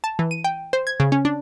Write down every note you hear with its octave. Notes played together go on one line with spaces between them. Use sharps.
A5
E3
D#7
G5
C5
G#6
C#3
C#4
D4